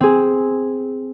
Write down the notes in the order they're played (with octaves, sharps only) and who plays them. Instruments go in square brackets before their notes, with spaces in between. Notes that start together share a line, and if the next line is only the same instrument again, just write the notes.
[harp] C4 G#4